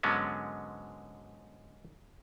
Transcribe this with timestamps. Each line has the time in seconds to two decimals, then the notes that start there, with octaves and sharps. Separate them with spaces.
0.03 G#2 D3 F#3 G#3 B3 C#4